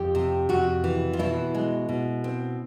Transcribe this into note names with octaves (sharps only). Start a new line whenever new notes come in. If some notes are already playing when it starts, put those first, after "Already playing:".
Already playing: F2 G4
C3
F2 F#4
E3
F4
B2 E4
G#3
B2
C4